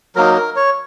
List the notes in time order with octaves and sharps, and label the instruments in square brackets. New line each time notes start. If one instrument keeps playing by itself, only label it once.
[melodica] F#3 A#3 D#4 A#4
A#4
C#5